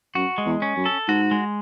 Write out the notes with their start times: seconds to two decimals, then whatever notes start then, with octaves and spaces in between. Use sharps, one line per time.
0.15 F#2 F#4
0.38 G#3
0.46 E2
0.62 C#4
0.77 F#2
0.86 A4
1.08 G#2 F#4
1.31 G#3